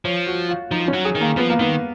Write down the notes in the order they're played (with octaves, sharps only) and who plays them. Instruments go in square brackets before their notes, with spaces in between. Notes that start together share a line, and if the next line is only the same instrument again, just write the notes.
[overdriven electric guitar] F3 [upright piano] C#5
[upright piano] F#4
F4
[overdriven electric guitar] F3 [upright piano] D#4
[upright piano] C#4
[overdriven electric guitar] F#3
[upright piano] G#4
[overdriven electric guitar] D#3
[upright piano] A#3
[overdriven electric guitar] F3 [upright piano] B3
[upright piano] A#3
[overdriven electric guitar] D#3 [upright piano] B3